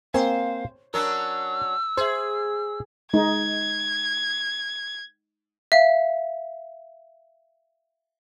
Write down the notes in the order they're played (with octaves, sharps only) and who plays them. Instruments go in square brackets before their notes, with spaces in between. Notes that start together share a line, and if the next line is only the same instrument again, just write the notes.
[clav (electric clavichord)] A#3 C4 G#5 [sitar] C5 [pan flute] F5
[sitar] F#3 C#4 D4 [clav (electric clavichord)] A#4 [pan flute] E6
[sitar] G#4 [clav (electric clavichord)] C5 E5
[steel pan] G#3 D#4 [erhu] G#6
[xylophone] E5 F5